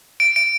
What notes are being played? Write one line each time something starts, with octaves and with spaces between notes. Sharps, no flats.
D7
D7